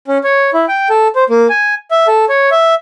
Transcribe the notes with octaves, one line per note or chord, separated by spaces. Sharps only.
C#4
C#5
E4
G5
A4
C5
A#3
G#5
E5
A4
C#5
E5